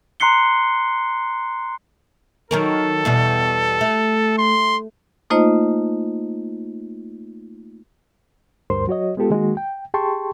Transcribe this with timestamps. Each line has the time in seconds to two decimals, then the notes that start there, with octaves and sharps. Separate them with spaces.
0.20 A#5 C6 F#6 C7 C#7 G7
2.51 D#3 F#3 A4 A#4
3.05 E2 B2 G3
3.81 A3
4.38 C6
5.30 A3 A#3 D#4 F4 C5 D#5
8.70 D2 G2 A#4 C5 C6
8.87 F#3 F#4 C#5 D#5
9.17 G#3 B3 F4 G4 A4
9.30 D#3 G#3 A#3 F#4
9.57 G5
9.94 G4 G#4 G5 A5 C6 C#6